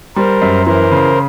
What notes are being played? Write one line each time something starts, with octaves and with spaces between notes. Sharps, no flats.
G3 A#4 C5
F#2
E3 A#4 C5
C#3